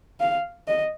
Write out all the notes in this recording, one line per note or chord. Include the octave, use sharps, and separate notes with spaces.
F5
D#5